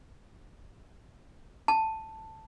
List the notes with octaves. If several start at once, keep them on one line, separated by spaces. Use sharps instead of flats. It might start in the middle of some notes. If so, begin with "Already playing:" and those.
A5